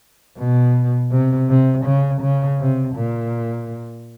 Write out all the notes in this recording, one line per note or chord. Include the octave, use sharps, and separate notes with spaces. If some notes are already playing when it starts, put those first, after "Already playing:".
B2
C3
C3
C#3
C#3
C3
A#2